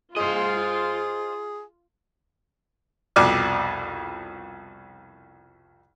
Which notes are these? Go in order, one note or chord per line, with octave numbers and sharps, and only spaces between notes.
F4 G#4 C5 D#5
C2 F2 B2 D5 D6 F6